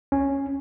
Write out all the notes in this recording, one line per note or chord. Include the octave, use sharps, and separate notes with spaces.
C#4